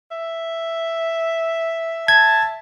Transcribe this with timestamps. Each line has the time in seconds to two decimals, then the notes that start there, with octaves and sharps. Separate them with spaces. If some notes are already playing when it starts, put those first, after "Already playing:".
0.11 E5
2.08 A5 G#6